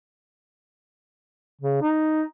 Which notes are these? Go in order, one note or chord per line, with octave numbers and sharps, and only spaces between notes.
C#3
D#4